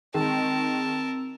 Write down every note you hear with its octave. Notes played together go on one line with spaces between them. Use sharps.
D#3 G#3 C4 A#4 A5 E6